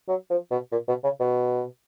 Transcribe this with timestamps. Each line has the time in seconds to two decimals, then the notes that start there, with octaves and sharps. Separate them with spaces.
0.08 F#3
0.30 F3
0.51 B2
0.72 A#2
0.88 B2
1.04 C#3
1.20 B2